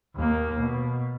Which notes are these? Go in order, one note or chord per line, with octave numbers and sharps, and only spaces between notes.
D#2 A#3
B2